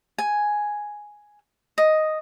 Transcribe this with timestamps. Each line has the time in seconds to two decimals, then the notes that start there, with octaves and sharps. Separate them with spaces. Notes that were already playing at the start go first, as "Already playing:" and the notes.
0.18 G#5
1.78 D#5